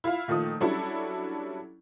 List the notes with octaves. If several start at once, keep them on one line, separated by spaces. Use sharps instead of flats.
E4 F4 E5 F5
A#2 D#3 F3 A3 D#6
F#3 G3 C#4 D4 E4 A4